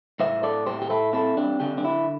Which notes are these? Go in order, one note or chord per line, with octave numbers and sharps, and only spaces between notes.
A2 C5 E5
A4 D5
A2 G4 C5
G4
E4 A4
C4 E4 A4
D4 G4
D3 D4 G4
D4
E4